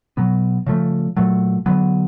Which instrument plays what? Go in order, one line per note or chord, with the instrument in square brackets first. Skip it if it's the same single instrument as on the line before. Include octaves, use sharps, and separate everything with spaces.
[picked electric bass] B2 F#3 B3
C#3 F3 A3
A#2 F#3 A3
D3 F#3 B3